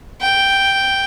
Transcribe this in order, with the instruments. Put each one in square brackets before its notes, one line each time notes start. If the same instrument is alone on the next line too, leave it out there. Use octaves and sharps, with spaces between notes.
[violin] G5